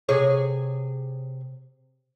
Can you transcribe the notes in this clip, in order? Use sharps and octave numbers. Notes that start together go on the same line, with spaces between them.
C3 G#4 C#5